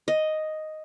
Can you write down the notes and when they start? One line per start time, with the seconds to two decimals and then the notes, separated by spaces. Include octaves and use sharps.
0.08 D#5